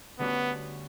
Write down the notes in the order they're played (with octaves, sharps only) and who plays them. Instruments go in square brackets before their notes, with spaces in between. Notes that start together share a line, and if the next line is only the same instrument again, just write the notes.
[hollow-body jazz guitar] D2 D3 G3 C#4 F#4 [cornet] B3